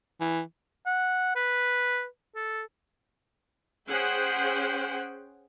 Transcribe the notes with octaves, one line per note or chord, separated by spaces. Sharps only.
E3
F#5
B4
A4
C#4 G#4 C5 F#5 G5